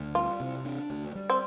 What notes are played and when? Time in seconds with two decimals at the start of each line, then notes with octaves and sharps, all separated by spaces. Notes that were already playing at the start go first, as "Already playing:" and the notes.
Already playing: D2
0.15 G3 F4
0.40 C3
0.65 D4
0.90 D2
1.15 G3
1.30 C4